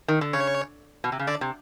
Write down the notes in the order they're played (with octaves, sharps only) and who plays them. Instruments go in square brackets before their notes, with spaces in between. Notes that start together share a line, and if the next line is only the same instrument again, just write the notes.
[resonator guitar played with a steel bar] D#3
D3
[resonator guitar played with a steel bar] C#3 [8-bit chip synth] C#5
[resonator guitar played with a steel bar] B2
C3
C#3
[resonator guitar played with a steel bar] D3 [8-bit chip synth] D5
[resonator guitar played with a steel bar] C3